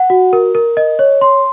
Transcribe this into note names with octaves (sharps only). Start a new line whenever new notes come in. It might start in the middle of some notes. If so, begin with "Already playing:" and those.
Already playing: F#5
F#4
A#4
A#4
D#5
C#5
C6